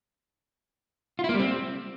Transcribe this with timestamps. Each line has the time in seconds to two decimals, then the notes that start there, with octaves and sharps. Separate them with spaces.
1.19 F4
1.24 E4
1.29 A#3
1.34 G3
1.39 C4